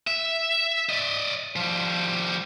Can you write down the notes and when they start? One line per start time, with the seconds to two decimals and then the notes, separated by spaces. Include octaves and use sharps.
0.07 E5
0.89 D5 D#5
1.56 F3 G3